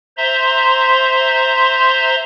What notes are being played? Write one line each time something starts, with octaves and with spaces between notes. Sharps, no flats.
C5 E5 A#5 C6